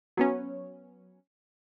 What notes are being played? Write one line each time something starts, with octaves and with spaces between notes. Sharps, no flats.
F#3 B3 C#4